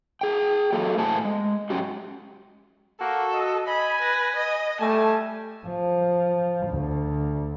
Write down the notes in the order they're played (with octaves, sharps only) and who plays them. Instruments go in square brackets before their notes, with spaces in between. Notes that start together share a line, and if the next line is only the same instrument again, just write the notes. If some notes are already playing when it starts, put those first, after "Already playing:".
[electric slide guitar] G#4 G5
F#3 A#3 A4
A2 C5 G#5 A5
G#3
G#2 F#3 C#4 F#4 G4
[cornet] A#3 [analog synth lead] F#4 [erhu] A4
[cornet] D#5
[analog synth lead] D#5 [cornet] G#5 [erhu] B5
[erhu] B4 [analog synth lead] A#6
[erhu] D#5
[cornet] G3 [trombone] A3 [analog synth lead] G#5 [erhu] A5
[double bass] F3
D2